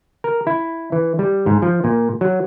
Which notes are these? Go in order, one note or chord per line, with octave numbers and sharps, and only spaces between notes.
A#4
E4
E3
G3
G#2
F3
A#2
F#3